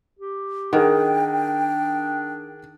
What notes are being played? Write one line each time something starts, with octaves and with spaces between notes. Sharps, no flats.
G4
D#3 D4 G#4 A#4 F#5 G5